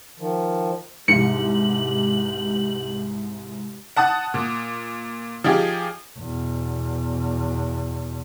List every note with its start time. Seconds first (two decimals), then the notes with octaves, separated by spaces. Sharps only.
0.19 D#3 F3
1.08 C2 G#2 B2 G#3 G4 C#7 F#7
3.96 F#5 A5 D#6 F#6
4.34 A#2
5.44 F3 D#4 G4 G#4
6.18 E2 B2